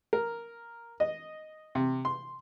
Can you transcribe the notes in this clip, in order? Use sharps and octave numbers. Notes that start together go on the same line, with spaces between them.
A#4
D#5
C3
C6